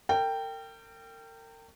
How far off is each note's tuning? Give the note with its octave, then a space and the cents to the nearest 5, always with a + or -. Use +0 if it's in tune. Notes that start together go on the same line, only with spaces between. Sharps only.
A#4 -40 G5 +0